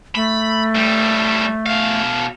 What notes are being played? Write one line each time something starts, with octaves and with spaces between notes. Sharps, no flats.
A3 B5
A2 G3
B2 F5